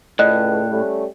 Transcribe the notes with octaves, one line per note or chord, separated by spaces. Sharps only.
C#2 A2 D5 D#5 F#6
G3 A3 C#4